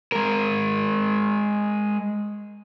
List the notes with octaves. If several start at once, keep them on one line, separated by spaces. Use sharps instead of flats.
G#3 A#4